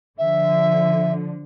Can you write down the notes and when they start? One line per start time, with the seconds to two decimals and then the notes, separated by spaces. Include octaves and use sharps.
0.18 D3 F3 E5